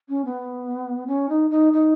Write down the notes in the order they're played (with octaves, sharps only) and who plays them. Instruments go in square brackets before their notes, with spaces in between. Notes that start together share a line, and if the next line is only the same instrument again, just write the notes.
[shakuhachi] C#4
B3
C#4
D#4
D#4
D#4